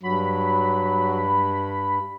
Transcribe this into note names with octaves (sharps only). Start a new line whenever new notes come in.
G2 F#3 B5